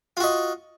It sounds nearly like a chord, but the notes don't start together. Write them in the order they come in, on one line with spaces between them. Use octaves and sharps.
F4 F#4 D#5